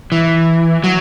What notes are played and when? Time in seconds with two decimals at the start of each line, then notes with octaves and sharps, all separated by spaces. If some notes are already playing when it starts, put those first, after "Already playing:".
0.12 E3
0.84 F#3